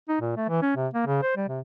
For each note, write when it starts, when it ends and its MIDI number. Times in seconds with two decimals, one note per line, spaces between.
0.09 0.17 63
0.21 0.32 46
0.36 0.46 57
0.49 0.61 52
0.62 0.74 61
0.76 0.88 48
0.94 1.05 58
1.07 1.22 49
1.22 1.36 72
1.37 1.48 55
1.49 1.60 48